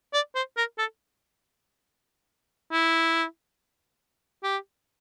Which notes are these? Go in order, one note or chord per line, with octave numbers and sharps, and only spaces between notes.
D5
C5
A#4
A4
E4
G4